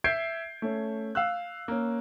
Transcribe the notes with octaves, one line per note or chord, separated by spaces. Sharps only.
E5 G6 G#6 C7 D7
A3 C#4
F5 E6 F#6
A#3 C#4